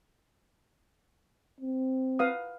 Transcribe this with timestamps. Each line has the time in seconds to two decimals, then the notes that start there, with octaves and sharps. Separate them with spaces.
1.61 C4
2.19 B4 F5 D#6